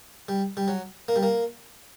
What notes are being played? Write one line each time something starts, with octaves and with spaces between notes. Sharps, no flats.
G3
G3
F#3
A#3
G3
A#3